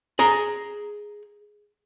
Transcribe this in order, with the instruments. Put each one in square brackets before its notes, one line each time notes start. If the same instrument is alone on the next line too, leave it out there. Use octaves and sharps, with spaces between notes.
[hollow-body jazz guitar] G#4 A#5